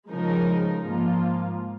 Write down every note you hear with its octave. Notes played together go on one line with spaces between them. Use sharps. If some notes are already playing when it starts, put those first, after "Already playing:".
C#3 F3 G#3 D#4 A#4
G#2 F3 A#3 F4